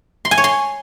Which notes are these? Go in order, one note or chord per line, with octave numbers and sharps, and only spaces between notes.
C6
G#5
C#5
C6